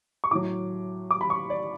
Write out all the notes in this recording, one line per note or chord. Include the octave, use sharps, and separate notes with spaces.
C#6
A2 F#3 D6
D6
B5
C#6
D5